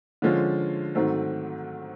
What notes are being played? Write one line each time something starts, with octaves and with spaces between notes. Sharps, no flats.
D3 F3 G#3 C#4 F4
G#2 D#3 F#3 A3 C4